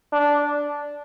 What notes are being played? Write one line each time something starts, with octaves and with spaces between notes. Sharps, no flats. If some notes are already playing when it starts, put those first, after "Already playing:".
D4